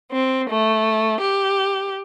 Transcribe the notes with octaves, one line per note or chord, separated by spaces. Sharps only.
C4
A3
G4